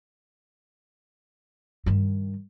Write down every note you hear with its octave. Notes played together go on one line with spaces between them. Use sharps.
G2 D#3